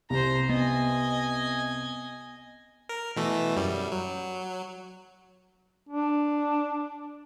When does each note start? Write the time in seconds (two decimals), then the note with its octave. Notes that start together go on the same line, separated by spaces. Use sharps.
0.10 C2 C5 A#5
0.49 B3 D#5 G#5
2.89 A#4
3.16 B2 E3 A3
3.57 F#2 G3
3.92 F#3
5.89 D4